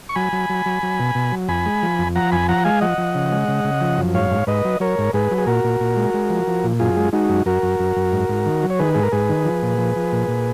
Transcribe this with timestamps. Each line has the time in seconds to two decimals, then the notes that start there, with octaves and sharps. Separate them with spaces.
0.09 C#6
0.16 F#3 G#5 B5
0.33 F#3
0.50 F#3
0.66 F#3
0.83 F#3
0.99 B2
1.15 B2
1.32 F#3
1.48 F2 G#5 B5
1.66 G#3
1.83 F3
1.99 F2
2.16 F3 F#5 A#5
2.32 F2 G#5 B5
2.49 F3 F#5 A#5
2.64 G#3 F5 G#5
2.81 F3 D#5 F#5
2.98 F3
3.15 C#3
3.31 G#3
3.48 C#3
3.64 C#3
3.81 F3
3.98 F#2
4.14 G#2 C#5 F5
4.31 G#2
4.47 G#2 B4 D#5
4.65 F#3
4.80 F#3 A#4 C#5
4.98 G#2
5.13 G#2 G#4 B4
5.31 F#3
5.38 G#4
5.47 A#2 F#4 A#4
5.64 A#2
5.80 A#2
5.96 G#3
6.14 G#3
6.30 F3
6.47 F3
6.64 A#2
6.79 F#2 F4 G#4
6.97 G#3
7.13 G#3 D#4 F#4
7.29 F#2
7.46 F#2 F#4 A#4
7.63 F#2
7.80 F#2
7.96 F#2
8.12 G#2
8.29 G#2
8.46 D#3
8.63 F#3
8.70 C#5
8.79 D#3 G#4 B4
8.94 G#2 G#4
9.03 A#4
9.12 G#2 G#4 B4
9.29 D#3
9.45 F3
9.63 A#2
9.78 F3
9.96 F3
10.12 A#2
10.28 A#2